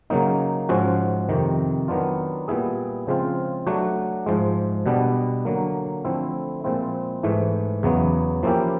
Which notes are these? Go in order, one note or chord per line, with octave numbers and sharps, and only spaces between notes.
C#3 F#3 A#3 D#4
G#2 F3 G#3 C#4 F#4
F2 C3 D#3
D#3 F#3 B3 D4 F4
A#2 G3 B3 E4 G#4
C#3 F3 G#3 C4 F4
F#3 A3 D4 F#4
G#2 F3 G#3
B2 G3 B3 D4
D3 F#3 A#3
D3 F3 A3 C4 E4
A#2 F3 G#3 C4 E4
G#2 E3 A3
E2 C#3 F#3 B3
F3 A#3 C#4 E4 G4